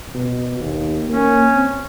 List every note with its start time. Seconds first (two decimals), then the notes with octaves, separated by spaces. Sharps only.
0.14 B2
0.60 D#2
1.09 A#3 C#4
1.54 C4